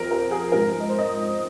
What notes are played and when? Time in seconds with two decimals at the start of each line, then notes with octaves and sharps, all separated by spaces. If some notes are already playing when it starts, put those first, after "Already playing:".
Already playing: F2 F3 C4 A#4
0.11 A#4
0.31 G#4
0.52 G#2 F3 C4 A#4
0.80 D#5
0.89 C5
0.98 D#5